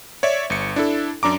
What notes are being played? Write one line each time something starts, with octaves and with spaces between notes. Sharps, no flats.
C#5 D5 E5
G1 C#7
D4 E4 A4
F#2 D4 A#5 D6